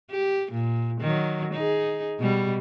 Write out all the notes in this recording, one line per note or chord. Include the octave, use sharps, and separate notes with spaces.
G4
A#2
D#3 F#3
D#4 G#4
B2 G3